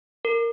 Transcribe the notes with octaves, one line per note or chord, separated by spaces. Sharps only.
A#4